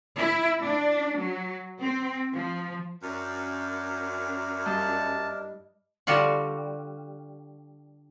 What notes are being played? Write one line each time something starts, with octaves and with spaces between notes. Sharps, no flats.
E4
D4
F#3
C4
F3
F#2 D4 E4 A#4
G2 G3 D#5 A5
D3 G3 F4 F#4